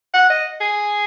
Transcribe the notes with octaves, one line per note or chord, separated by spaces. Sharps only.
F#5
D#5
G#4